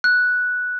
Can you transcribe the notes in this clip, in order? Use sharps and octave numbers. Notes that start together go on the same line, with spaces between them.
F#6